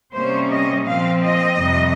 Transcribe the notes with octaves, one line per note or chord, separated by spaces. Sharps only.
C3 G3 A#3 C#4 C5
D#5
A#2 F3 C4 F5
D#5
F2 C3 G3